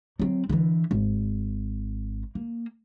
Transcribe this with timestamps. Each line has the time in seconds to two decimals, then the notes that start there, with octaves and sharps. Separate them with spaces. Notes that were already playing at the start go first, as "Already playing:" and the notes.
0.19 F#3 C4
0.49 D3 E3
0.91 G#1
2.35 A#3